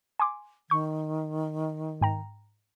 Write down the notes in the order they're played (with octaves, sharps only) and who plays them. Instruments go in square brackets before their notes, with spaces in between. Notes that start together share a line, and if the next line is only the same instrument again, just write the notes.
[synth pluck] G#5 C6 D6
[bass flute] D#3 [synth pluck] C#6 G6
[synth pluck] G#2 G5 A#5